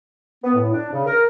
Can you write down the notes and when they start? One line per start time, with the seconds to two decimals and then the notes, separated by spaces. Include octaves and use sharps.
0.44 B3
0.55 A2
0.73 D4
0.92 C#3
1.06 A#4